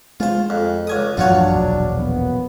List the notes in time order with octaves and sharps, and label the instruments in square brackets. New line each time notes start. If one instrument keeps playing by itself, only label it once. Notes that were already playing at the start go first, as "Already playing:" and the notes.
[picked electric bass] G#3 [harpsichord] F4 C5
[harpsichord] F2
C#2 G#5 D#6
[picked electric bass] A1 F#2 F3 [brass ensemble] F#3 D4 [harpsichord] F4 F#4 C#5
[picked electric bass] E1 A#1
[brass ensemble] F#2 B3